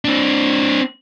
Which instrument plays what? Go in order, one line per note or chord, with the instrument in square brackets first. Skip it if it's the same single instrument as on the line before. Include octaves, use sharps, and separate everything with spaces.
[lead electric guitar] C4 D4